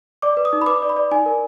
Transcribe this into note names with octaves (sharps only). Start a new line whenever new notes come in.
D5 D6
B4
D#6
D#4
B5
B4 D6
D5
B5
D5
D#4 G#5
A#4